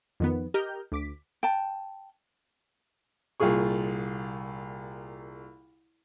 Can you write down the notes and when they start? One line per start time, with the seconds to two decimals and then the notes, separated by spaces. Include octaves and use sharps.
0.20 F2 D#3 B3
0.54 G4 A#4 D#5 A#5 F6 G6
0.92 D2 D6 B6
1.43 G5 A5
3.40 C2 A#2 F4 G#4 C#6